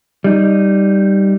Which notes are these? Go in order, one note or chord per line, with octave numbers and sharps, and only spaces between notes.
G3 D#4